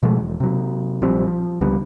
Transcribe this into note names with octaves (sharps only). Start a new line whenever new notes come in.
B2 F3 G#3 A3
E1
C3 F#3
A#1 F3 G3 C4
F3
C#2 D3 G3 B3